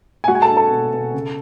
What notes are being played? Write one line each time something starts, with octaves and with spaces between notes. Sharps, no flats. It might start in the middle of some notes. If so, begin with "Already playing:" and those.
G#5
G#3 F#4 F#5
G#5
A4 A5
D4
A4 A5
B2
B2
C#3